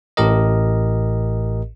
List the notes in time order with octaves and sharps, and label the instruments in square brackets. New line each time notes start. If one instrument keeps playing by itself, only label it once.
[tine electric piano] A1 A2 G4 A#4 D#5